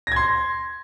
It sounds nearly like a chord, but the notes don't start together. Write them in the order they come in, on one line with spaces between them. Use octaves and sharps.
A#6 G#6 C6